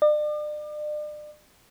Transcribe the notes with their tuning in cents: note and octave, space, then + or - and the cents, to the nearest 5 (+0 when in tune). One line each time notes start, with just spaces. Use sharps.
D5 +40